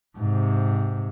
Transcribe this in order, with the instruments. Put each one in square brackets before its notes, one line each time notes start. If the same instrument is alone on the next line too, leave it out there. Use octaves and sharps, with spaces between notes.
[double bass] G#2 C3